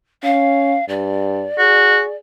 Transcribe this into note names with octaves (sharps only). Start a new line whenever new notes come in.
C#4 F5
G2 D5
F#4 G#4